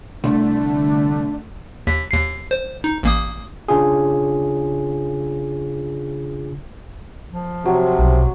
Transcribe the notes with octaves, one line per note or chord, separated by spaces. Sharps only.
C2 D3 A3 D4
D#2 B6
D#2 C7
C5
D#4
A1 A#3 D#6
C#3 D4 F4 G#4
F3
C3 F#3
B1